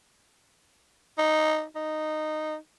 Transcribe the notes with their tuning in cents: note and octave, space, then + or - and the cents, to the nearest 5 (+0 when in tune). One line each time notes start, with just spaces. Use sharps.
D#4 -5
D#4 -10